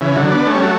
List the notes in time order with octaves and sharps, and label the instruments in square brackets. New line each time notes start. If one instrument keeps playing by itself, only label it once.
[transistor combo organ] C#3 E3
D3 F#3
B3 D4
A3 C#4
G3
F#3 A3